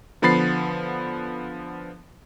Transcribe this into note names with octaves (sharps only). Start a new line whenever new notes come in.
D3 F3 B3 B5 A6 C7